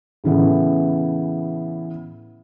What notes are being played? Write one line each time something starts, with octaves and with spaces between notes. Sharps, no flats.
A2 C#3 E3 B3